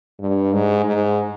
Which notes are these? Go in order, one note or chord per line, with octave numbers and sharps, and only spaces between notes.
G2
G#2
G#2